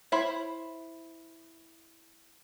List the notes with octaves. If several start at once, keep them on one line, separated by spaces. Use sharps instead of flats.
E4 C5 C#5 B5